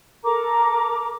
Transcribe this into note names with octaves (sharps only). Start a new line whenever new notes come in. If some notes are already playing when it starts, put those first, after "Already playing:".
A4 A#4 A#5 D6